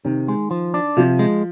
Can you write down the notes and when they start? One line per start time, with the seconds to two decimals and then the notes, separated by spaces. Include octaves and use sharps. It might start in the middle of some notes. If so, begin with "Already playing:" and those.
0.05 C3 D#3
0.28 G#3
0.51 F3
0.74 D4
0.97 C3 F3
1.19 G#3